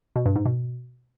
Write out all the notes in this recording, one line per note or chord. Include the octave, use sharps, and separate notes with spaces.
B2
G2
G#2
B2